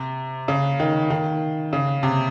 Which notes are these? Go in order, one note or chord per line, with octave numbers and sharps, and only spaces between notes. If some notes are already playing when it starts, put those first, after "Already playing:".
Already playing: C3
C#3
D#3
D#3
C#3
C3